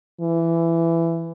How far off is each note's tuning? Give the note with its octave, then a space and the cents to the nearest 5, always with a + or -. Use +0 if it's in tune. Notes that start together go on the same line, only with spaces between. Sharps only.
E3 +15